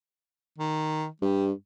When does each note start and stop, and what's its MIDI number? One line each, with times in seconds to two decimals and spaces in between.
0.58 1.07 51
1.22 1.52 43
1.22 1.48 55